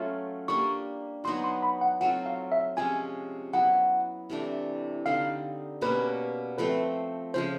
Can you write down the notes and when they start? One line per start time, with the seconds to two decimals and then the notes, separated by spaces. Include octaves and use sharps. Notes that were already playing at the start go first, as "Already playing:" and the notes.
Already playing: F#3 A3 C#4 F4
0.48 G3 A#3 D4 C#6
1.24 F#3 B3 D#4 F#4 C6
1.44 C6
1.63 B5
1.81 F#5
2.01 F#3 A3 C4 F4 F#5
2.26 F5
2.52 E5
2.77 C3 F3 G#3 C#4 G#5
3.53 F#3 B3 E4 F#5
4.30 C3 E3 A3 D4
5.06 D3 G3 C4 D#4 F5
5.81 B2 G3 A#3 C#4 B4
6.58 F3 A3 C4 B4
7.34 C#3 F3 G#3 C5